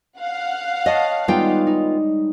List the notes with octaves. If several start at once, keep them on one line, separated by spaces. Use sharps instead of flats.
F5 F#5
C#5 D#5 A5 D#6
G3 G#3 B3 D#4 F4 G5
D#4